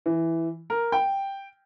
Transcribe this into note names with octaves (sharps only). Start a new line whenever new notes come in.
E3
A#4
G5